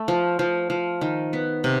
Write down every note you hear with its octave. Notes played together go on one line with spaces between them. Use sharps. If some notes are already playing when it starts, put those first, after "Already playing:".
Already playing: A3
F3
F3
F3
D#3
B3
C3